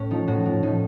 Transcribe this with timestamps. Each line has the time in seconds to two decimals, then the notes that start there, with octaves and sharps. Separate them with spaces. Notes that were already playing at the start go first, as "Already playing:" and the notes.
Already playing: A2 C#4
0.11 F3 D#4
0.28 A2 F#4
0.46 F3
0.63 A2 D#4